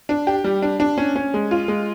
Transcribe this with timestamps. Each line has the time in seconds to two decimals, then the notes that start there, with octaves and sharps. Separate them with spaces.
0.09 D4
0.27 G4
0.44 G3
0.62 D4
0.80 D4
0.98 C#4
1.16 C#4
1.34 G#3
1.51 F4
1.68 G#3